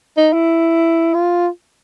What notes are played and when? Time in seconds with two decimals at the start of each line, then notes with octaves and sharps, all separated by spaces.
0.17 D#4
0.33 E4
1.14 F4